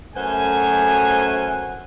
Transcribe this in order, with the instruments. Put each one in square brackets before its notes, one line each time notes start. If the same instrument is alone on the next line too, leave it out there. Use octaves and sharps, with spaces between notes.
[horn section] F#2 A3 F#4 C5 G#5